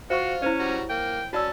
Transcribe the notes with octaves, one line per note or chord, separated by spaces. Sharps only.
F4 F#4 C5 F5 C#6
C#4 E4 C5 C#5
G3 F#4 A#5
A#3 G5
C#4 F#4 D5 A5 E6